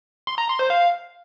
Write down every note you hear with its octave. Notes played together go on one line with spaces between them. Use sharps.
C6
A#5
C6
C5
F5